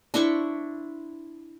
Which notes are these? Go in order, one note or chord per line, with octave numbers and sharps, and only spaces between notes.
D4 E4 C5 C#6